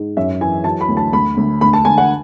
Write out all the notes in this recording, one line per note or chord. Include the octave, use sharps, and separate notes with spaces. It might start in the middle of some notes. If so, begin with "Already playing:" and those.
Already playing: G#2
F#2 E5
E3 G#5
F#3 A5
B5
D2
A5
D2 B5
D2
D2 B5
A5
D2 G#5
F#5